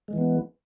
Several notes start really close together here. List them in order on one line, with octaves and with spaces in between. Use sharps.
G#3 E3 B3